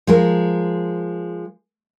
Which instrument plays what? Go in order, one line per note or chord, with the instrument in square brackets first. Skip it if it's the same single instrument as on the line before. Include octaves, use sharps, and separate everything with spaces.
[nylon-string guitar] F3 G#3 A#4